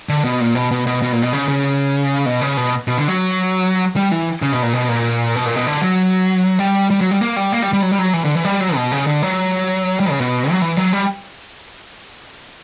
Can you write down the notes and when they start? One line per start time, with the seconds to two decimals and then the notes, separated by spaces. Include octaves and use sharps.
0.09 D3
0.24 B2
0.41 A#2
0.55 B2
0.71 B2
0.87 B2
1.02 B2
1.13 A#2
1.22 B2
1.33 C#3
1.48 C#3
2.26 B2
2.41 C#3
2.57 B2
2.88 B2
2.98 D3
3.08 F#3
3.96 G3
4.11 E3
4.42 C#3
4.52 B2
4.63 A#2
4.73 B2
4.88 A#2
5.36 B2
5.45 A#2
5.56 B2
5.67 D3
5.82 F#3
6.59 G3
6.91 G3
7.01 F#3
7.11 G3
7.21 A#3
7.36 G3
7.52 A#3
7.62 G3
7.73 G3
7.82 F#3
7.92 G3
7.99 F#3
8.13 E3
8.24 D3
8.35 E3
8.44 G3
8.61 F#3
8.75 B2
8.92 C#3
9.07 D3
9.23 F#3
10.00 G3
10.10 C#3
10.20 B2
10.51 F#3
10.62 E3
10.77 F#3
10.93 G3